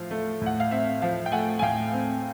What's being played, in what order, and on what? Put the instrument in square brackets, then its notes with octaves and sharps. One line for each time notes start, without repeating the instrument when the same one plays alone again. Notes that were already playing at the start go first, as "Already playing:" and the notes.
Already playing: [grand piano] A2 F3 F5
A3
A2 F#5
F5
C4 E5
F3 F5
G5
A3 F#5 G#5
G#5
A2 F5 G5
C4